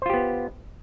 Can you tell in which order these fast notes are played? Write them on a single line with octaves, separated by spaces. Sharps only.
C5 F4 G4 B3